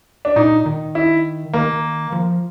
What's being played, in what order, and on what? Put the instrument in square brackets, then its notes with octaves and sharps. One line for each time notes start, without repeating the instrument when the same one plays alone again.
[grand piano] D4
[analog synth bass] A#2 [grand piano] D#4
[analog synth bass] D#3
[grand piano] E4
[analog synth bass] D#3 [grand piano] A#3
[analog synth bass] F3